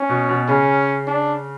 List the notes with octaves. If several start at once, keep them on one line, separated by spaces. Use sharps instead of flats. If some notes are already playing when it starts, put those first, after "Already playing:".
Already playing: C#4
B2
B2
C#3 C#4
D4